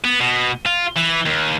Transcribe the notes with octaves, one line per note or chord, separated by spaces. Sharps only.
B3
B2
F4
E3
D#2